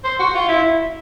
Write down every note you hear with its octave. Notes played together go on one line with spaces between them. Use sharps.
C5
F#4
F4
E4